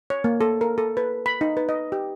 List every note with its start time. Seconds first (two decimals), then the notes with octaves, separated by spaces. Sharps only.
0.10 C#5
0.24 A#3
0.41 A4
0.61 A#4
0.78 A4
0.97 B4
1.26 B5
1.41 D#4
1.57 B4
1.69 D#5
1.92 G4